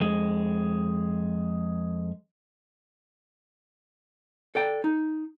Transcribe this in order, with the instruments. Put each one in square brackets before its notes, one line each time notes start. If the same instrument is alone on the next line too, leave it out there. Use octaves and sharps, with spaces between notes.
[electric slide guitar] F2 G#3
[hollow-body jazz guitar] A4 D5 G5
D#4